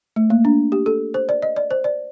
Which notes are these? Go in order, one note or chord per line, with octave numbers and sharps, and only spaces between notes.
A3
A#3
D4
G4
A4
C5
D5
D#5
D5
C5
D5